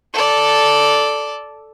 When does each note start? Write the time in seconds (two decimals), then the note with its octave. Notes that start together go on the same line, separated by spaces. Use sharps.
0.14 A4 D5